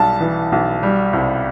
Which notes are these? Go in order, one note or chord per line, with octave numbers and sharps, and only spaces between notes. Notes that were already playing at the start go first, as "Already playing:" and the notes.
Already playing: B1 G3 A5
E3
B1
G3
C2